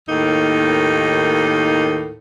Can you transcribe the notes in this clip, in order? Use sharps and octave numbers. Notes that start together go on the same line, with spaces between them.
D#2 A2 A#3 D#4